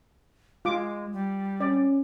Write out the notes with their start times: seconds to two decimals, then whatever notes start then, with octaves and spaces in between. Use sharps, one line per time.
0.65 G#3 F4 D6
1.13 G3
1.61 C#4 D5